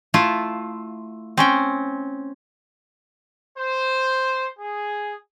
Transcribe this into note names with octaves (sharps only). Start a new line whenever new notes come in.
A3 E4 F4
C4 C#4 G5
C5
G#4